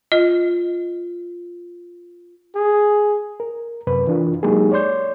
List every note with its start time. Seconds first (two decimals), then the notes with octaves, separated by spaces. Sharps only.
0.12 F4 D#5
2.55 G#4
3.40 A#4
3.87 F#2 C3 B4
4.07 E3 D4 F4 A#4
4.43 F#3 G#3 A#3 D#4 G4 G#4
4.72 C#5 D5 C6 G6